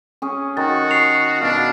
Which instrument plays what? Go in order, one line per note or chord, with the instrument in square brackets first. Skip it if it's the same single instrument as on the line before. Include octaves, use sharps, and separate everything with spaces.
[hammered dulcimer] C#4 G#4
[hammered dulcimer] D#3 G#4 [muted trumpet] F#4 [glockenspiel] A6
[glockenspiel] C7 F7
[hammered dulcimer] B2 F5 [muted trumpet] D4 [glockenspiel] F6